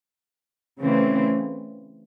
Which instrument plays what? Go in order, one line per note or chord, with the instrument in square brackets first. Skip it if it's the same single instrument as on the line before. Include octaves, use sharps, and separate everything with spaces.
[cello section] C#3 E3 A3 C4